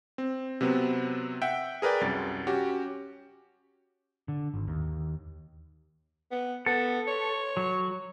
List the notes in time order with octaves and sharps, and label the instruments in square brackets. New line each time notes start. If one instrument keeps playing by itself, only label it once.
[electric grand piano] C4
C3 F#3 B3 C4
E5 F#5 G5
G#4 A#4 B4 D5 G5
C2 F#2 A6
C#4 F#4 G4
[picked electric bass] D3
G#1
D#2
[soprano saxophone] B3
[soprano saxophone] B3 [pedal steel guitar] A4
[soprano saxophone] C#5
[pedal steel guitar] F#3